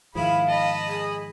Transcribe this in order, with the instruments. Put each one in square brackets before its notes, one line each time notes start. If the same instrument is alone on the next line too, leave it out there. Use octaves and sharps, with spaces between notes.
[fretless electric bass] G#2 D#3 F3 [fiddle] E4 [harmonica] G#4 B5 [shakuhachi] F5
[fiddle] D#5 B5 [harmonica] A5
[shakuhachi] G#4